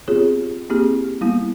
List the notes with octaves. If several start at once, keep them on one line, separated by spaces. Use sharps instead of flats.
B3 C4 F4 G4 G#4 C#5
A#3 C4 E4 G4 G#4
G3 A#3 B3 E4